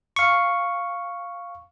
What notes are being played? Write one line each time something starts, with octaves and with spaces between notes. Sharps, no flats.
F5 C#6